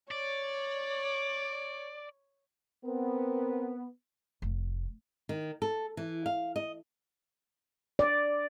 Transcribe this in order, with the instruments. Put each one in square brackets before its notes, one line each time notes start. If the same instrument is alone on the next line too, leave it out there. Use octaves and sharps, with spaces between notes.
[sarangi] C#5 [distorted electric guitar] D5
[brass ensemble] B3 [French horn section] C4 A#4
[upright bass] F1
[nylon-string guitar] D#3
A4
E3
F5
D#5
[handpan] D5